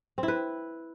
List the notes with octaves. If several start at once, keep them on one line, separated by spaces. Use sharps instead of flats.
C4
E4
B4